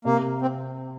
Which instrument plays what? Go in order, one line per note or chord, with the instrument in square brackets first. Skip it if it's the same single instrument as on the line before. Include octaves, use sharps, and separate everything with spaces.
[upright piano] C3 [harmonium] A#3
[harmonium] C4